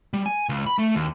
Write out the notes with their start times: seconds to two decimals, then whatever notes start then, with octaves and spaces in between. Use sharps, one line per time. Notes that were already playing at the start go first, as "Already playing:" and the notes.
0.14 G3
0.26 G#5
0.49 C#2
0.66 B5
0.79 A3
0.95 D#2